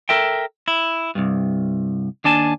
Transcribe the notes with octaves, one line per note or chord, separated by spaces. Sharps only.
A4 A#4 E5 G5
E4
C2 G2
D#2 D4 G#5 A5